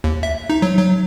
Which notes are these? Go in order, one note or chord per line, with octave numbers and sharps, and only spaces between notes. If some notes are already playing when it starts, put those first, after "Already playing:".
D#2
E5
D#4
F#3
F#3